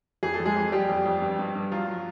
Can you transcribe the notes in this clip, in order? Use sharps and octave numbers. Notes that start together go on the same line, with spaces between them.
F2 G#4
A4
F2
G#3 G#4
F2
F2 G3 G4
F2
F2
G2
G2
G2
F3 F#3 F4
F#3